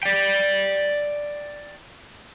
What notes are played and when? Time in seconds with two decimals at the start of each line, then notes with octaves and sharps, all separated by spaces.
0.03 D5 G5